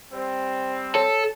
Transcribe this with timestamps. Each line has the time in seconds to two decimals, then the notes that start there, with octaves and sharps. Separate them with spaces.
0.12 G3 C4
0.95 A4 C#5